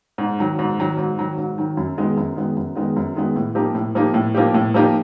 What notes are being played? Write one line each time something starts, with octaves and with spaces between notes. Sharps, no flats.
G#2
D#3 F#3
G#2
D#3 F#3
G#2
D#3 F#3
G#2
D#3 F#3
F#2
D#3 G#3 B3
F#2
D#3 G#3 B3
F#2
D#3 G#3 B3
F#2
D#3 G#3 B3
A2
F3 A#3 D#4 G4
A2
F3 A#3 D#4 G4
A2
F3 A#3 D#4 G4
A2
F3 A#3 D#4 G4